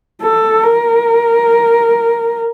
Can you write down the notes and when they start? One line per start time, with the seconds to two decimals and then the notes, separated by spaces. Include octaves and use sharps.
0.22 A4
0.64 A#4